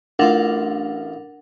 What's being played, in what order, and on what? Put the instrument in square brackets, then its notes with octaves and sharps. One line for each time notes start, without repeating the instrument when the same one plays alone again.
[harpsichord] A1 F4 D6 [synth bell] D4 A#4 F#5